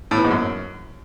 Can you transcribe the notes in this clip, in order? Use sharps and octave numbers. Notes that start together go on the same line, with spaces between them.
A2
E3
G#2
F#2